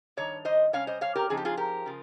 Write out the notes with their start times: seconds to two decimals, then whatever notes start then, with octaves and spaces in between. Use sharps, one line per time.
0.17 G2 D#3 C#5
0.45 C5 D#5
0.73 C3 G3 C#4 C#5 F5
0.87 C5 D#5
1.01 C#5 F5
1.15 G4 A#4
1.30 C#3 F3 C4 D#4 G#4
1.37 G4
1.45 F4 G#4
1.57 G4 A#4
1.86 C#3 F3